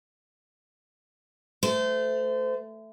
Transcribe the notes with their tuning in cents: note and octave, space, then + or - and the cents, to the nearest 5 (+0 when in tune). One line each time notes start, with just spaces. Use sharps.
A3 +0 C5 -30